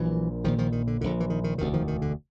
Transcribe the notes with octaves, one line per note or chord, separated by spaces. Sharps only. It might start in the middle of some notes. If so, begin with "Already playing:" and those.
Already playing: A#1 A#2 E3 F#3
A#1 A#2 D#3 F3
D#3 F3
D#3
D3
A#1 A#2 D3
E3
D#3
D#3
E1 D2 C3 D#3
D#3 F3
D#3
D3